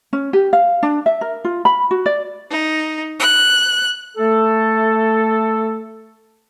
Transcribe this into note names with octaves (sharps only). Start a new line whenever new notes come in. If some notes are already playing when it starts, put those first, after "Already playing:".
C#4
G4
F5
D4
E5
A#4
F4
B5
F#4
D5
D#4
F#6
A3 A4